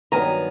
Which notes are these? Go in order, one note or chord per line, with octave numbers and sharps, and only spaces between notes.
G2 D#3 F#3 B3 G#5 A#5